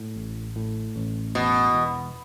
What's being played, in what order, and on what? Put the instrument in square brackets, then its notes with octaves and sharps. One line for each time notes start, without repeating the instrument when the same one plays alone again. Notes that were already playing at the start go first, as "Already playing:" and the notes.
Already playing: [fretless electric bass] A2
A1
A2
A1
[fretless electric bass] E2 [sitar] B2
[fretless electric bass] E1